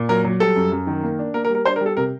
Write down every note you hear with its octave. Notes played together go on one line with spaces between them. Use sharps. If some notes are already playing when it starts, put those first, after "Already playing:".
Already playing: A#2
F#3 A#4
F#3
G3 A4
F#2
F#2
D#3
A#3
D4
A#3 A#4
A#4
G3
A#4
D4 C5
A#4
G3
A4
C3 A#4